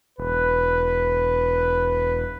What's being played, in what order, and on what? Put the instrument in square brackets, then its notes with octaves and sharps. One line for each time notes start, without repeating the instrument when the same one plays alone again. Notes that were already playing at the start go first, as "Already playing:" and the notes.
[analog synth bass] E1 [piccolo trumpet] B4